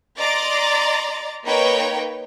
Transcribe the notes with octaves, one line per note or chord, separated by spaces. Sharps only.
D5 D#5 A#5 C6 D6 A6
A#3 D#4 A#4 B4 C#5 G5